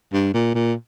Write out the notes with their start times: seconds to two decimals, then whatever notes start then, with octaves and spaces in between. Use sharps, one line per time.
0.13 G2
0.34 A#2
0.55 A#2